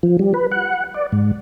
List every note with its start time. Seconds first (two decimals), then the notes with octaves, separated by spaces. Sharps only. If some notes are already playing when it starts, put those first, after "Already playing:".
0.03 F3
0.19 G3
0.34 B4
0.52 F#5
0.94 D5
1.12 G#2